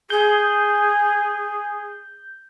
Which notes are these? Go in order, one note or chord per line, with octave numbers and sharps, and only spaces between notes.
G#4 G6